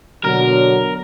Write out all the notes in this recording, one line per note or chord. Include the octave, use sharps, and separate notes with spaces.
B2 D3 F#3 A#4